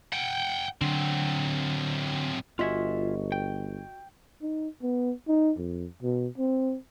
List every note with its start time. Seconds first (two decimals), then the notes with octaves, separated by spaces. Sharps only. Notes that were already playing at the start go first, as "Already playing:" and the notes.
0.13 F#5 G5
0.81 D3 F#3 C4
2.59 G1 F4 F#4 D#5 E5 G#5
3.32 G5
4.42 D#4
4.82 B3
5.28 D#4
5.58 F2
6.02 B2
6.38 C4